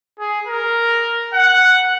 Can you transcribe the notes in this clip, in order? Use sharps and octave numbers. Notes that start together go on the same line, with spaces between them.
G#4
A#4
F#5